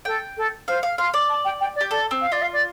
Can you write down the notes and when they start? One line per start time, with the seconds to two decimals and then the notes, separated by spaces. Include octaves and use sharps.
0.05 A4 G5
0.37 A4
0.68 C5 F5
0.83 F5
0.98 F5 C6
1.14 D5
1.29 A5
1.44 G5
1.60 G5
1.75 D5
1.81 G4
1.90 A4 D5
2.11 C4
2.21 F5
2.32 F4 D5
2.41 F5
2.52 D5